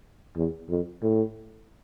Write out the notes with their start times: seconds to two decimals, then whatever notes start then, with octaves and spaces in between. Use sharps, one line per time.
0.36 E2
0.69 F2
1.02 A2